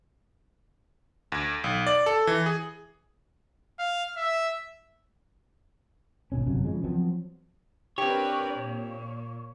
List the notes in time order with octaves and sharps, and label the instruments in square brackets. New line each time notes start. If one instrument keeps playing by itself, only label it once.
[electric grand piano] D2
B1
D5
A4
E3
G#4
[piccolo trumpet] F5
E5
[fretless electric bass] G#1 C#2 B2 C#4
G1 F#2 C3 F#3
C#3 F3 G#3
F3 F#3 B3 C4
[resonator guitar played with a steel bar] C4 G4 [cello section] D4 A#4 B4 [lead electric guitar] C#5
[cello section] A#2